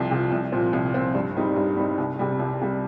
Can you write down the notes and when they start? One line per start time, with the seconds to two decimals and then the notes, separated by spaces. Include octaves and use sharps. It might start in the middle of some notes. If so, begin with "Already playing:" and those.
Already playing: C2 C3 F3
0.11 C3 F3
0.32 C2
0.52 A#2 F3 C4
0.73 C2
0.94 A#2 F3 C4
1.15 G2
1.36 G3 C4 D#4
1.56 G2
1.77 G3 C4 D#4
1.98 C2
2.19 C3 G3
2.39 C2
2.61 C3 G3